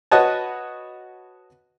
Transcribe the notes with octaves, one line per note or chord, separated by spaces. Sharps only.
F#4 B4 C#5 D#5 F#5 A5